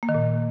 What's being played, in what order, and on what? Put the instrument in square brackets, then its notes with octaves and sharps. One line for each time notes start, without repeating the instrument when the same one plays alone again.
[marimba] A#3
D#3
A#2